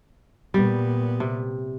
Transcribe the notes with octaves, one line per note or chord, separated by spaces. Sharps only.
A#2 G3 B3
C3